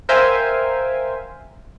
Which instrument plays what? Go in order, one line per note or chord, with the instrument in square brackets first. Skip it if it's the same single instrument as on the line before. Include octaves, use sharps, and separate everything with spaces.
[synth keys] A#4 C5 E5 F5 G5 G#5